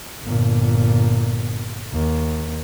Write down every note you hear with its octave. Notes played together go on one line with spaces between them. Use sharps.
G1 A#2
D#2